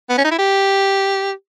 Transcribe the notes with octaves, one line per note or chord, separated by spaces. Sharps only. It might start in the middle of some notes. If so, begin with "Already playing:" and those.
B3
C#4
D#4
E4
G4